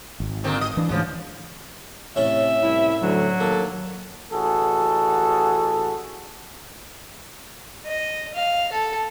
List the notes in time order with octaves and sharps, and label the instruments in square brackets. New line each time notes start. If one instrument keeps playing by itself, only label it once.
[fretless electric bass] G#1
[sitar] A#2 D3 C4
D#5
[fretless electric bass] E3 D4
[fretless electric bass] D2 G#2 E3 [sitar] C#3 F3
[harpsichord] A2 C#4 A4 [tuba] C3 [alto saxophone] E5
[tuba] C2 [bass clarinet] E4
[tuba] D2 [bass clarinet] F#3
[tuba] D#2 [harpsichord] A#3 [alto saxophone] A4
[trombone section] A1 F#4 G#4 A4
[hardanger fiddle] D#5
F5
A4